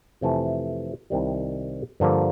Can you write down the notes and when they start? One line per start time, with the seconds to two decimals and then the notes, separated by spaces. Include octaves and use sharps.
0.21 F2 C3 E3 A3
1.10 C2 C3 D#3 G3
2.00 G2 D3 F3 A#3